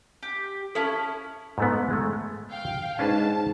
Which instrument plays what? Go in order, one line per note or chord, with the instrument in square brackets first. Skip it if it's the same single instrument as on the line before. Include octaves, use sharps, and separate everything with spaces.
[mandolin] G4
[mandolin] C#4 E4 [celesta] A4 A5
[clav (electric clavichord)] G#2 A3 B3
G#3 A3
[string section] F5 G5
[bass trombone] G#2 [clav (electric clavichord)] C#4 D4 B4 [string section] A5